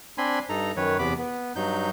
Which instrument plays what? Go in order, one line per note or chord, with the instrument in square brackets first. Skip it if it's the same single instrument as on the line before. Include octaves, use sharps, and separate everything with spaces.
[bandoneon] C4 D4 G#5 B5 C6
G2 D#4 A4 A#5
F#2 D#3 B4 C#5
E2 C3 B3 B5 D6
B3
G2 F#3 D#4 G6